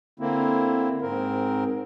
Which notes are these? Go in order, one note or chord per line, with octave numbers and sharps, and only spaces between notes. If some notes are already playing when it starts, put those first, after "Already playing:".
D3 A#3 C4 E4
G#2 C4 A#4